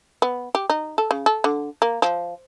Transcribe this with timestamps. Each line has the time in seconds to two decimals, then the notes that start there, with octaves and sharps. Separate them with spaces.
0.22 B3
0.55 G4
0.70 D#4
0.98 A4
1.11 C#3
1.26 A4
1.44 D3
1.82 A#3
2.02 F3